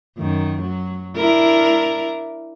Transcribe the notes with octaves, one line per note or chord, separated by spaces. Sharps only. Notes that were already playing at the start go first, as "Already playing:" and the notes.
F#2 D#3
F#3
D4 E4 A#4